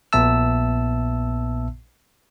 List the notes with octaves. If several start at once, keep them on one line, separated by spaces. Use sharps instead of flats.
A#1 A#2 B3 E5 A5 E6